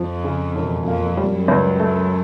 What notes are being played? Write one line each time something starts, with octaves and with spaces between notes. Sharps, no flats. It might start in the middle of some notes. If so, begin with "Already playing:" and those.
Already playing: F2 F3
C#3
E1
F2 A#3
G3
F#2
C#2
A3